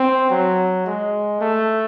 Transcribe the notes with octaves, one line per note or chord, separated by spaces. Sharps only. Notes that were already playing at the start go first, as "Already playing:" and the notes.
Already playing: C4
F#3
G#3
A3